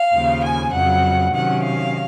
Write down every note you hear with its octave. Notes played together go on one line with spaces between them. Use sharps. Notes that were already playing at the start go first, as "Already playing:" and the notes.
Already playing: F5
D#2 C#3 F3
G#5
F2 C#3 F#3 F#5
C3 D#3 F#3 C#4 F#5
F5